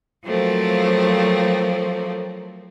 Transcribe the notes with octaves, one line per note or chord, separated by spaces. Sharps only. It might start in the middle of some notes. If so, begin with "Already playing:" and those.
F3 F#3 A3 A#3 C4